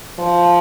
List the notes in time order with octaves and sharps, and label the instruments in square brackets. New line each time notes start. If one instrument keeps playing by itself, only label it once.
[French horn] F3